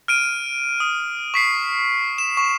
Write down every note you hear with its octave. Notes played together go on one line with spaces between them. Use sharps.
F6 D7 D#7
D#6
C#6 B6 C7
E7
C#6